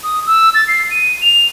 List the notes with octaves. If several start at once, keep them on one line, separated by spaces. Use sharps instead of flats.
D#6
E6
A6
C7
D#7
F7